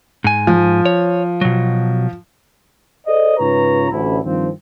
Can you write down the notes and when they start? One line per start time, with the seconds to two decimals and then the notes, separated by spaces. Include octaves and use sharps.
0.24 G#2 G#5
0.47 F3
0.85 C#5
1.41 B2 F#3
3.07 G#4 A4 C5 D5 D#5
3.38 G#2 C#3 F4 B4 C#5 A#5
3.90 A1 D2 E4
4.24 G2 D#3 F3 C4